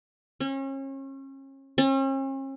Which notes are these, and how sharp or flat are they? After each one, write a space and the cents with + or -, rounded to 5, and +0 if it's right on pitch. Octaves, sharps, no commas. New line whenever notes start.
C#4 -35
C#4 -45